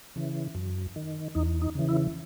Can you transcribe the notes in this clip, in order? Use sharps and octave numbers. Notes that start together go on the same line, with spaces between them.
C#3 E3
F#2
D#3
E2 D#4
D#4
C#3 E3
E4